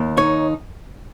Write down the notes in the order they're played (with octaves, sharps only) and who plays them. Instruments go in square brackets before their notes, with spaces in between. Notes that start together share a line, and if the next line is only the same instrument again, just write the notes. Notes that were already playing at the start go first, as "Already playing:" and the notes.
Already playing: [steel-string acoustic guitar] D#2
[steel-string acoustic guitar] D#4 [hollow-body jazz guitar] C#5